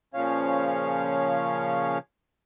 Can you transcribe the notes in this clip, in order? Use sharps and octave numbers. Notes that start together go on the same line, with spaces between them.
A#2 C#3 F3 C#4 C#5 F5